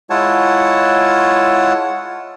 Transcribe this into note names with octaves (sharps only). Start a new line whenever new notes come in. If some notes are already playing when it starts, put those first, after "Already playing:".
G#3 E4 F4 C#5 F#5 A5